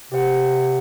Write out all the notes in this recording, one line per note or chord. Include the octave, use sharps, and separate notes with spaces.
C3 G4 C5 F#5